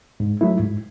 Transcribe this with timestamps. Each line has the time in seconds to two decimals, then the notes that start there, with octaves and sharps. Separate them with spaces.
0.20 G#2
0.41 F#3 A3 E4
0.60 G#2